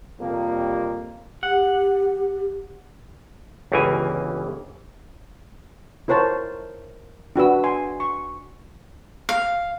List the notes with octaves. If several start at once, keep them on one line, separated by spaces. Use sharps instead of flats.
F2 C3 F3 G3 A#3
G4 F#5
G1 C#2 C#3 E3 A#3 G#5
E4 A#4 C5 C#5 A5
D4 F#4 B4 E6
G#5 C6
C#6
F5